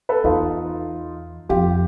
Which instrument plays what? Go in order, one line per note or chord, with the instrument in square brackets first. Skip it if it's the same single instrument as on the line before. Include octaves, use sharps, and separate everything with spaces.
[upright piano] A4 B4
[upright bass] E2 [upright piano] D#4 F4
[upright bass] F2 [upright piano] F4 G4